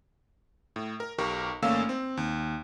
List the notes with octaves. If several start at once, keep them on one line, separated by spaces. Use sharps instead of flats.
A2
A#4
B1 G4 A#4 C#6
G#1 A3 A#3 C#4 F5 E6
C4
D#2